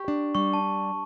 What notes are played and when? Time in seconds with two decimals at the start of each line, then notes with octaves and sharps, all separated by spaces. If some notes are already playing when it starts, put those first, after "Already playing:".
Already playing: G4 C#6
0.08 D4
0.35 G3 C#6
0.53 A5